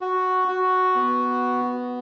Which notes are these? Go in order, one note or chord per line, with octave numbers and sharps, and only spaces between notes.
F#4
F#4
B3